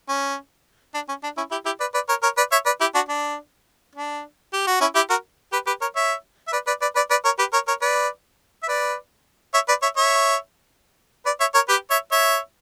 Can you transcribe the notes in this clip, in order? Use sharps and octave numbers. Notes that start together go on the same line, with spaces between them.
C#4
D4
C#4
D4
C#4 E4
E4 G4
E4 G4
B4 D5
B4 D5
A#4 C#5
A#4 C#5
B4 D5
C#5 E5
B4 D5
E4 G4
D4 F#4
D4
D4
G4
F#4
C#4 E4
E4 G4
F#4 A#4
G4 B4
G4 B4
A#4 C#5
C#5 E5
E5
B4 D5
B4 D5
B4 D5
B4 D5
B4 D5
A#4 C#5
G4 B4
A#4 C#5
A#4 C#5
B4 D5
E5
B4 D5
C#5 E5
B4 D5
C#5 E5
C#5 E5
B4 D5
C#5 E5
A#4 C#5
G4 B4
C#5 E5
C#5 E5